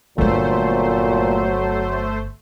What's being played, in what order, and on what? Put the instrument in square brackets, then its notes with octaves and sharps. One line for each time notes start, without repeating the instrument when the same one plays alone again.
[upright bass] G1 B3 [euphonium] A#2 [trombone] F#3 [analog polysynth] A3 C5